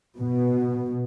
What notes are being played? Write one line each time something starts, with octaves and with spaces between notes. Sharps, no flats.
B2